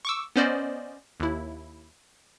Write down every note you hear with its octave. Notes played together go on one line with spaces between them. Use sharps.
C#6 D6 E6
B3 C#4 C5 D5 D#5
D#2 E4